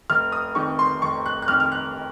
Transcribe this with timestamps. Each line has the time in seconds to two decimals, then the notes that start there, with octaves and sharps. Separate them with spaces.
0.10 F1 F6
0.32 D#6
0.55 F2 D#3 C#6
0.79 C6
1.02 F1 C#6
1.26 F#6
1.42 F#6
1.48 F2 D#3 F6
1.60 F6
1.72 F#6